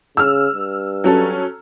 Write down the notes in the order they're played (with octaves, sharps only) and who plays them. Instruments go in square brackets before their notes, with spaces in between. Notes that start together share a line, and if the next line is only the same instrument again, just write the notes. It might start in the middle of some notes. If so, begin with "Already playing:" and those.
[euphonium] C#3 [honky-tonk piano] E6 F6
[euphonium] G2
[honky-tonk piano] F#3 C#4 A4